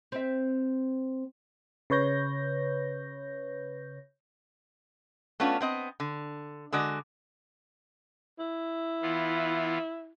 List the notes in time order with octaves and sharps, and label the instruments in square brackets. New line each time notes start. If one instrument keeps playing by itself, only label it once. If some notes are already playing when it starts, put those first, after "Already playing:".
[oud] C4 E5
[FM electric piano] C#3 B4 C#5 G6 A#6
[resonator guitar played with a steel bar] A3 B3 C#4 D4 F4
B3 C4 D#5
D3
D3 G#3 F#4 D5
[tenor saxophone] E4
[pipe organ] E3 B3 F4